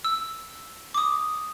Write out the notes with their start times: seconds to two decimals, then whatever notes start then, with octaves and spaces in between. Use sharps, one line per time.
0.04 E6
0.94 D6 D#6